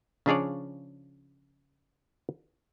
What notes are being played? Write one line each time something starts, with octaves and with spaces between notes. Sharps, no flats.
C#3 F3 D4 G#4 C#5 D5